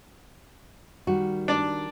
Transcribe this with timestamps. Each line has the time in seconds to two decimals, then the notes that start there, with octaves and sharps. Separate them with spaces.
1.07 D#3 G3 F#4
1.48 D4 D5